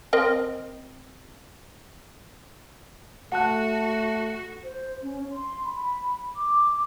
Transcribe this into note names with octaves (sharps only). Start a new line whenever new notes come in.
C4 A#4 D#5
A3 F#4 F#5 A5 F#6
C5
C#4
C6
B5
D6